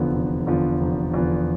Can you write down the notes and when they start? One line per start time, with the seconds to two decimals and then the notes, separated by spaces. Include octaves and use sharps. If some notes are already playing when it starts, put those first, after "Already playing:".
Already playing: F1 E2 D3 F3 B3
0.13 F1
0.47 E2 D3 F3 B3
0.81 F1
1.14 E2 D3 F3 B3